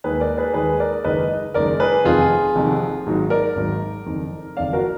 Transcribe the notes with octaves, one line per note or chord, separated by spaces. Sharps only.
D#2 D#3 G#3 G#4 B4
A#4 D5
G#4 B4
D#2 D#3 G#3 G#4 B4
A#4 D5
F#1 F#2 D#3 G#3 B4 D#5
F#1 F#2 D#3 G#3 A#4 D5
G#4 B4
F1 F2 D#3 F4 G#4
F1 F2 D#3
G#1 G#2 D#3 F#3
A#4 D5
G#1 G#2 D#3 F#3
F#1 F2 D#3
F#1 F2 D#3 D5 F5
F#4 A#4